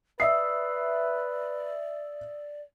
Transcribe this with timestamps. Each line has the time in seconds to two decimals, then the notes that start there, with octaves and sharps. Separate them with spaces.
0.20 B4 D5 E5 D#6 E6 C7